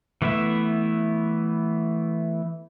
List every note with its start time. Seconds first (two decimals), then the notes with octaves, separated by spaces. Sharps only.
0.22 E3 A3 B3 E4 E5